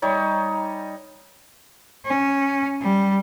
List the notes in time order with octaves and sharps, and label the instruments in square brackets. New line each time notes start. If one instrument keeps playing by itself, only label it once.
[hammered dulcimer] G3 D#4 C#5
[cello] C#4
G3